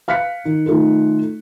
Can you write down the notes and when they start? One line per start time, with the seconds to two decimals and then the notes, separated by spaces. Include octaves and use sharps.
0.08 F5 F6 F#6 B6 C#7
0.45 D#3
0.66 D#3 A3 D#4 F4 A4